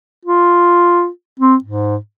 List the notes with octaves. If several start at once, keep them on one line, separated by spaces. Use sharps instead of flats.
F4
C4
G#2